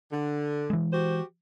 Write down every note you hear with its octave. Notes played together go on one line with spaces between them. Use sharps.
D3
E3 G#3
F#4 G4 C5